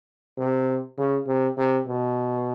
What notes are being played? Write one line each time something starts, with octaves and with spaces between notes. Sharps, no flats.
C3
C#3
C3
C3
B2